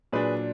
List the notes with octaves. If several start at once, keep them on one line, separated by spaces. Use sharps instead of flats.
A#2 F#3 D4 G#4 B4